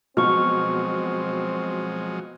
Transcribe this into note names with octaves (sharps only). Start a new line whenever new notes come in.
B2 F3 F#3 G#3 C4 C#6 F6